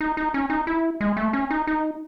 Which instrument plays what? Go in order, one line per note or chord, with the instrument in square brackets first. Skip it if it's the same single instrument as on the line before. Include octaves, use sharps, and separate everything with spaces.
[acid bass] D#4
D#4
C#4
D#4
E4
G#3
A3
C#4
D#4
D#4